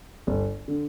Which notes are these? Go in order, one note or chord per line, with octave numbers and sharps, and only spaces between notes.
G1
D3